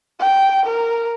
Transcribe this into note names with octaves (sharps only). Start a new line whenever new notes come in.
G5
A#4